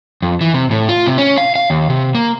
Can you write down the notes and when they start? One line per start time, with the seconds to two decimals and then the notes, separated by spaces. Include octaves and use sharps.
0.22 F2
0.41 E3
0.54 C3
0.71 A2
0.89 F4
1.07 C3
1.18 C#4
1.38 F5
1.56 F5
1.70 D#2
1.90 C3
2.15 A#3